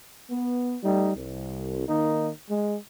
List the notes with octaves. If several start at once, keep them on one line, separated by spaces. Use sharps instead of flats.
B3
G3 A3 D#4
C2
D#3 A#3 D#4
G#3